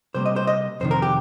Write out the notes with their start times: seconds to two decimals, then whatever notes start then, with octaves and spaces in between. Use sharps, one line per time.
0.15 C3 G3 A#3 C5
0.26 D#5
0.36 C5
0.47 D#5
0.80 F2 C3 D#3 C5
0.91 A#4
1.02 G4